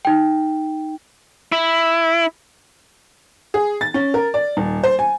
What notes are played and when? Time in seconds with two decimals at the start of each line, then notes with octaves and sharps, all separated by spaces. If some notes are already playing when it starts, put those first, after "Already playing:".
0.05 D#4 G5
1.52 E4
3.54 G#4
3.81 A6
3.94 C#4
4.14 A#4
4.34 D5
4.57 D#1
4.84 C5
4.99 G#5